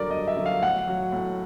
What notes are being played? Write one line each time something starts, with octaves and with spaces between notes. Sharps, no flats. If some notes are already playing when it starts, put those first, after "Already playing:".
Already playing: G2 D3 F#3 A#4 D5
G2 D#5
E5
D3 F#3
F5
A2 F#5
F#3
A2